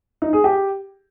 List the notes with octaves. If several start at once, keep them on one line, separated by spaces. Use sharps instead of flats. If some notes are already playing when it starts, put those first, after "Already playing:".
D#4
G#4
G4